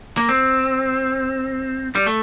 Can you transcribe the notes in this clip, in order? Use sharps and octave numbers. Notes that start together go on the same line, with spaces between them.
A#3
C4
G3
A3